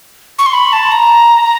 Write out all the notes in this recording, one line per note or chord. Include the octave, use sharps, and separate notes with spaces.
C#6
C6
B5
A5
A#5